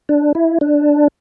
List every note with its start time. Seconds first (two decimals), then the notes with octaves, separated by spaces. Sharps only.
0.09 D4
0.35 E4
0.61 D4